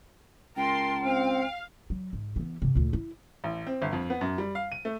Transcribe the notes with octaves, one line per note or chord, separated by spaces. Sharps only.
C#2 A#4 G5 A5 C6
C4 F5
F#3
G#2
E3 B3
G2 C3
D2 A#2
E4
A1
C4
G1
F2
B3
F#2
G3
F5
D#7
A3